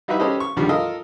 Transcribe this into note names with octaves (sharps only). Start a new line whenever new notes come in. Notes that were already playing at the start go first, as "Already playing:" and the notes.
G3 D#4 E4 F#4 B4 E5
C#4 G4 A4 B4 C5 D#5
C#6
C#2 G2 D3 D#3 F3 G3
F4 A4 A#4 D#5